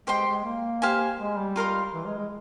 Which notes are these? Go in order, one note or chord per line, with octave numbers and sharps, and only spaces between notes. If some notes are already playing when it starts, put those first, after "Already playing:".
G#3 G4 C5 G5 C6
G#3
A#3
G4 C5 F5 G#5
G#3
G3
F4 A#4 F5 C6
E3
G#3
G#3